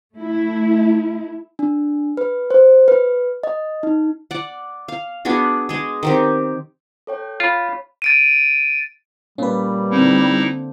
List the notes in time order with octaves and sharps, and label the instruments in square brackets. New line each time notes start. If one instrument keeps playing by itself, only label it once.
[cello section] A3 E4
[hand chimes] D4
B4
C5
B4
D#5
D#4
[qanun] D5 F#5
F5
B3 D4 F#4 G#4
G#3 G#4
D#3 C4 G4
[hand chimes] A4 C#5 G5
[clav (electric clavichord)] F4 [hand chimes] C#5 F5 B5
[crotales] A6 D7 D#7
[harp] A#2 [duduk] G3 [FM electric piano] C#4 B4
[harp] D3 C4 [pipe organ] D#4 E4